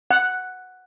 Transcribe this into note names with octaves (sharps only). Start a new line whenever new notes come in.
F#5